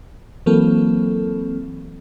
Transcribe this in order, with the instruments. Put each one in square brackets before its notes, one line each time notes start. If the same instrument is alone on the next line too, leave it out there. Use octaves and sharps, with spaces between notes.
[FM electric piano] E3 F#3 A#3 C4 A4